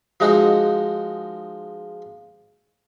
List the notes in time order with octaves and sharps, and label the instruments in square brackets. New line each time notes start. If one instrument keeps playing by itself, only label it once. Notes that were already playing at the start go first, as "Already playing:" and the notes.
[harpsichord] F3 G#3 D#4 F#4